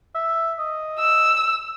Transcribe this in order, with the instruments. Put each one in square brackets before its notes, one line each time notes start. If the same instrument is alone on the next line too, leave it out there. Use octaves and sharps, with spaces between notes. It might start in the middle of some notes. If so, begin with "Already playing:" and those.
[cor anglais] E5
D#5
[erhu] E6